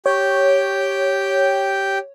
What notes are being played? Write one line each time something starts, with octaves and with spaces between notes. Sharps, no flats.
G4 C#5 G5